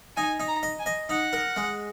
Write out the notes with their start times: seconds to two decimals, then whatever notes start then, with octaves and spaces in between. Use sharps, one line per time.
0.16 D#4 G#5
0.40 D#4
0.48 A#5
0.63 D#5
0.79 G#5
0.86 D#5
1.10 D#4 F#5
1.33 A#4
1.56 G#3